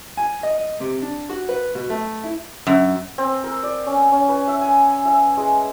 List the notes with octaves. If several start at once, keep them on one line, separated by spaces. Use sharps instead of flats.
G#5
D#5
D#5
C3
D4
F#4
B4
B2
A3
E4
F#2
C4
A#4
D5
C#4
C#4
B4
E5
G#5
E5
G#3